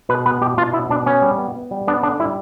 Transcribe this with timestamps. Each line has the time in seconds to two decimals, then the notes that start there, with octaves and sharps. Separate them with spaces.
0.09 B2 B4
0.26 B3 B4
0.41 B2 G4
0.57 B2 F4
0.73 B3 E4
0.90 B2 D4
1.06 B3 C#4
1.22 G3
1.38 B3
1.55 B3
1.71 G3
1.87 B3 D4
2.03 D3 D4
2.19 G3 E4